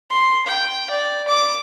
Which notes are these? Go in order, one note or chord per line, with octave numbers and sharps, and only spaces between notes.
C6
G5
D5
D6